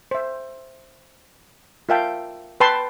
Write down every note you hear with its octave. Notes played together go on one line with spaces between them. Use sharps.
C5 E5
F4 A#4 E5 F5 G5 A5
B4 G5 A5 C6